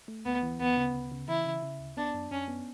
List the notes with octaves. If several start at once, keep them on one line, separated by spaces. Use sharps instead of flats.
A3
D2 B3
E3
D2 B3
C#3
D2
C#3
E3 E4
C#3
C#3
D2
B3 D4
F#2
F#2 C#4
B3